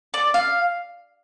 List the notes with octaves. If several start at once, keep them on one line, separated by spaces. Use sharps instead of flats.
D5
F5